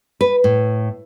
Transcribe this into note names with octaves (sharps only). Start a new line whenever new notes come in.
B4
A2